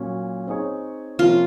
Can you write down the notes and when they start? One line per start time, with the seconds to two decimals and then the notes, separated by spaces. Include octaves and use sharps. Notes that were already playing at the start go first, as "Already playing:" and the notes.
Already playing: A#2 F#3 C#4
0.47 C4 D#4 G#4 C#5
1.19 C3 F3 A#3 C#4 F4